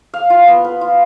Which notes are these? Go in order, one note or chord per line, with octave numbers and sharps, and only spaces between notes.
F5
F4
B3
B4
F4